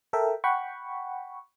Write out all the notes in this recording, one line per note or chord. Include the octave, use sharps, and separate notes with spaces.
A4 A#4 E5 G5
F#5 G5 B5 C#6